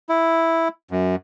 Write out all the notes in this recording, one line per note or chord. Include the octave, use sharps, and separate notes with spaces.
E4
F#2